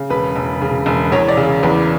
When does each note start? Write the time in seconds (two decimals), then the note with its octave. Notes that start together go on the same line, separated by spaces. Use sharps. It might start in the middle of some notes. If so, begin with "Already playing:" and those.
Already playing: C#3
0.10 E1 B4
0.36 E1
0.61 C#3
0.86 E1
1.12 E2 C#5
1.28 D5
1.37 C#3
1.63 E2 B4